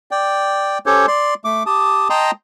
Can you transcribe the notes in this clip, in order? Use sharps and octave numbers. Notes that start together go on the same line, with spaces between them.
D5 G5
C#4 G4 A4 C5 C#5
D5 C6
A3 D6
G4 A5 D#6
D#5 G5 A5 A#5 C6 D#6